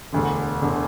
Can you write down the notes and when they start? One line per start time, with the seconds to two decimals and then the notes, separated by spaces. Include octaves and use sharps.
0.12 E1 D2 D3
0.62 E1 D3